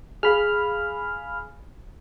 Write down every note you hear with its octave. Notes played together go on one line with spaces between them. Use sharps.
G#4 F5 B5 F6